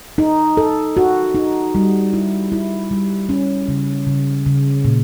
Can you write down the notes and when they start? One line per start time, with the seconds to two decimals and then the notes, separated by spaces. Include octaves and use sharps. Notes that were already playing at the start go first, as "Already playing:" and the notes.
0.18 D#4
0.57 A4
0.97 F#4
1.35 D#4
1.75 G3
2.13 E4
2.52 E4
2.91 G3
3.29 C#4
3.68 C#3
4.07 C#3
4.46 C#3
4.85 A#2